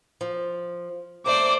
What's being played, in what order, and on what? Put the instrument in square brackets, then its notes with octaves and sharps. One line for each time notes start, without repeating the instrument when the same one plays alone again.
[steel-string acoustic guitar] F3
[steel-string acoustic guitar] A3 A#3 [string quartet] C5 D5 [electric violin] D6